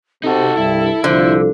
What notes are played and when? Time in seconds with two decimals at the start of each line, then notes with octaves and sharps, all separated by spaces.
0.24 C3 D#4 F#4 A4
0.57 C2 G2 E4
1.04 C2 D3 F3 C5